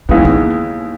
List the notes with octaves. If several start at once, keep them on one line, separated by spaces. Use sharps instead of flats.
D#2 C#3 E3 F#3 G#3 B3
A#3